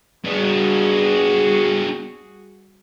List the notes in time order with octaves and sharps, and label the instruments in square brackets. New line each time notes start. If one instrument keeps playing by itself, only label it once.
[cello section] G3 F#4 G#4 [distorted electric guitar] B3 D4